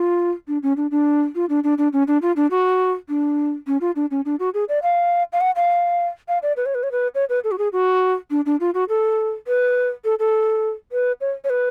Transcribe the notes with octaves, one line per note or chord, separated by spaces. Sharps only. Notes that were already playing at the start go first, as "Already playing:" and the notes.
Already playing: F4
D4
C#4
D4
D4
F4
D4
D4
D4
C#4
D4
F4
D4
F#4
D4
C#4
F4
D4
C#4
D4
F#4
G#4
D5
F5
F5
F#5
F5
F5
D5
B4
C#5
B4
C#5
B4
C#5
B4
A4
F#4
G#4
F#4
D4
D4
F4
F#4
A4
B4
A4
A4
B4
C#5
C#5
B4